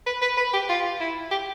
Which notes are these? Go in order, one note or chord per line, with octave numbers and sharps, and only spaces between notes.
B4
B4
B4
G4
F4
E4
G4